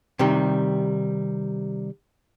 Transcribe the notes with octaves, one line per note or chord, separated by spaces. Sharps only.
C3 D#3 G3